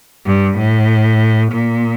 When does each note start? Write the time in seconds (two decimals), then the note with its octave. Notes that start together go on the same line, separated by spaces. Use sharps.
0.26 G2
0.57 A2
1.52 A#2